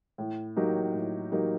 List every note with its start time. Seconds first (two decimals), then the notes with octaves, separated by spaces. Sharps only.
0.18 A2
0.57 F#3 A#3 D#4 G4
0.94 A2
1.32 F#3 A#3 D#4 G4